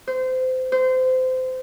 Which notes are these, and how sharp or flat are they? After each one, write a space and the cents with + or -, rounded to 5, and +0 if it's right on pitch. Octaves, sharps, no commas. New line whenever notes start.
C5 -25
C5 -25